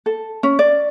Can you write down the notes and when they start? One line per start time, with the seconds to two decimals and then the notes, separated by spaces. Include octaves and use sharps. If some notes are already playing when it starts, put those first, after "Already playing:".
0.06 A4
0.43 C#4
0.59 D5